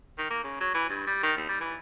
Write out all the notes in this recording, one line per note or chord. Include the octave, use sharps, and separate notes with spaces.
D#3
A#3
C#3
F#3
E3
G2
G3
D#3
D#2
G3
E3